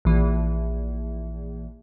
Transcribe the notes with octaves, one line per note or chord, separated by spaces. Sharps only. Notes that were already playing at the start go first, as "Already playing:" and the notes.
A#1 E3